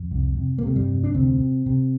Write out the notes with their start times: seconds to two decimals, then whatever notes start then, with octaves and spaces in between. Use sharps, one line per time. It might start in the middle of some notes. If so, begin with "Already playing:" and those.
Already playing: F2
0.11 C2
0.37 C3
0.58 A#3
0.63 C3 A3
0.76 G2 G3
0.89 F1
1.04 D4
1.14 D2 C3 C4
1.40 C3
1.66 C3